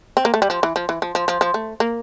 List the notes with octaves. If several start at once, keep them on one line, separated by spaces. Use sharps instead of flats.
C4
A#3
A3
G3
F3
E3
F3
E3
F3
F3
F3
F3
A3
A#3